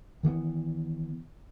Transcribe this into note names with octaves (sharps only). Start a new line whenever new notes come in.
D#3 E3 G3 B3